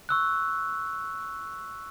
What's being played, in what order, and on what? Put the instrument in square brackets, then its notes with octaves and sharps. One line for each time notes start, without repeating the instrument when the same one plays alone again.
[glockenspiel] C#6 E6 F#6